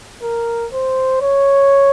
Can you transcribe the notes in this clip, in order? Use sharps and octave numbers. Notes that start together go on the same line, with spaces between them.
A#4
C5
C#5